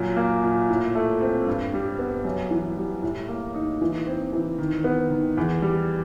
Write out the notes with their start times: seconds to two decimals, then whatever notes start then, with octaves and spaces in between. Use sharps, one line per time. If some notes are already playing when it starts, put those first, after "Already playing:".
Already playing: F#2 A#2
0.17 A#3
0.44 A#2
0.70 A2
0.95 A3
1.21 C4
1.46 G2
1.74 G3
1.99 B3
2.25 F#2
2.50 E3
2.77 G3
3.03 A2
3.28 A#3
3.55 D#4
3.81 E3
4.07 C4
4.33 E3
4.58 D#3
4.84 B3
5.11 D#3
5.37 E2
5.62 G3